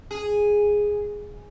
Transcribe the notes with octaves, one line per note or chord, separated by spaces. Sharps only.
G#4